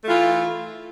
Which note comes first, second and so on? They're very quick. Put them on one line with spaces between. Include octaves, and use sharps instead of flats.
A3 F4 E3